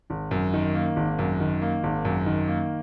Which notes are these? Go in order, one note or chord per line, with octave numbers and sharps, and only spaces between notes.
G#1
F#2
D#3
A#3
G#1
F#2
D#3
A#3
G#1
F#2
D#3
A#3